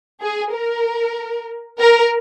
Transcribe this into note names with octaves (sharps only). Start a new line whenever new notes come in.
G#4
A#4
A#4